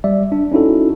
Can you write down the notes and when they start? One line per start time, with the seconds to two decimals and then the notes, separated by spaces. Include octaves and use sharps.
0.04 G3 D5 E5
0.32 D4
0.52 C#4 D#4 E4 F#4 A4